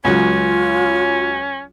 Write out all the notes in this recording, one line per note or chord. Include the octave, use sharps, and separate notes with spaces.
C#2 F#3 C#4 F4